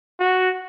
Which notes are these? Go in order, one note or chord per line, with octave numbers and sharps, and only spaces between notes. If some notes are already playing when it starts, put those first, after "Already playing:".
F#4